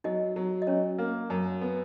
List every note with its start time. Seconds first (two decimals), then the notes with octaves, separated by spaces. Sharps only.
0.04 F#3 D#4 D#5
0.36 F#3
0.62 D#5
0.67 F#3 C#4 C#5
0.98 A#3
1.30 F#2
1.62 B3